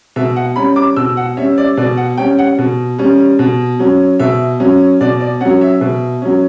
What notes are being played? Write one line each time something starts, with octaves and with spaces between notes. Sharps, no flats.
B2 E5
F#5
G3 C#4 B5
D6
B2 E6
F#5
G3 C#4 E5
D5
B2 D5
F#5
G3 C#4 G5
F#5
B2
G3 C#4
B2
F#3 C#4
B2 E5
F#3 C#4
B2 D5
D5
F#3 C#4 F#5
E5
B2
F#3 C#4